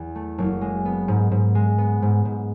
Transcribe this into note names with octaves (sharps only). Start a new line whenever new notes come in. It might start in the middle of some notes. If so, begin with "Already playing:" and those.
Already playing: E2
A3
F#1
G#3
B3
G#2
G#2
G#3
B3
G#2
G#2